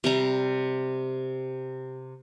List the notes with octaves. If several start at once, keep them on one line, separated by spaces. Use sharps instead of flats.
C3 G3 A#5